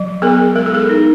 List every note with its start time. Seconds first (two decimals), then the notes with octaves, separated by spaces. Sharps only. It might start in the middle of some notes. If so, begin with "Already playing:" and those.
Already playing: F#3
0.22 B3 G#4 A#4
0.56 G#3 A#4
0.66 A4
0.75 G#4 A#4
0.89 D#4